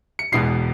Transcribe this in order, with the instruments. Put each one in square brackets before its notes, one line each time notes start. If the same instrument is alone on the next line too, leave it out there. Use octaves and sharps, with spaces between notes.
[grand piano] C#7
E1 E2 B2 G#3 B3 C7